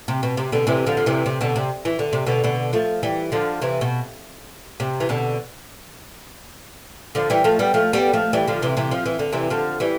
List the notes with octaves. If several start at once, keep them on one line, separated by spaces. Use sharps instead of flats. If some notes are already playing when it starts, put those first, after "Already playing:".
C3
B2
C3
B2 D3
C3 E3
D3 F3
F3
C3 E3
C3
B2 D3
C3
E3
D3
C3
B2 D3
B2 D3
F3 A3
E3 G3
D3 F3
C3 E3
B2
C3
E3
B2 D3
D3 F3
E3 G3
F3 A3
G3 B3
F3 A3
G3 B3
F3 A3
E3 G3
D3 F3
C3 E3
C3 E3
F3
E3
D3
C3 E3
D3 F3
E3 G3